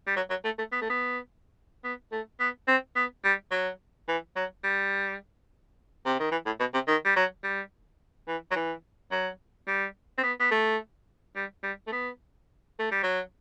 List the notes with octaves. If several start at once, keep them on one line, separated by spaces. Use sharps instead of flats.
G3
F#3
F#3
A3
A3
B3
A3
B3
B3
A3
B3
C4
B3
G3
F#3
E3
F#3
G3
C3
D#3
E3
A2
B2
C3
D#3
G3
F#3
G3
E3
F#3
E3
F#3
G3
C4
B3
B3
A3
G3
G3
A3
B3
A3
G3
F#3